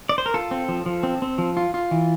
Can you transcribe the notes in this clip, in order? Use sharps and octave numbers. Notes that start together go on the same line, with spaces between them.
D5
C5
A#4
F4 A4
C4
F3
F3
C4
C4
F3
F4
F4
E3